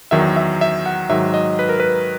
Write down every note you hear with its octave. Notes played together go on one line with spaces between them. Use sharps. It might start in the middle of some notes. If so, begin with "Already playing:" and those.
E2 D#3 F#3 E5
E5
E5
F#5
G#2 D#3 F#3 E5
D#5
B4
A#4
B4